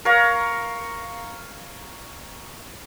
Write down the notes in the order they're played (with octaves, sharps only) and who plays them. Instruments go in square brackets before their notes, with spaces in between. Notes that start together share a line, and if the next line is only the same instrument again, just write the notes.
[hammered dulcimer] A#4 C#5 F5 A#5